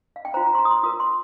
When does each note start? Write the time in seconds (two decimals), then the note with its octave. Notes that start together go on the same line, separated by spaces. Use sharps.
0.16 F5
0.25 G5
0.34 F4 C5 A#5
0.46 A#5
0.55 C6
0.59 A#5
0.65 D#6
0.71 C6
0.83 F4 A#4 D#6
1.00 C6